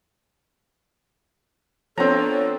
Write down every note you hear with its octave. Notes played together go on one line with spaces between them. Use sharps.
F3 B3 C4 D4 A4 C#5 A#5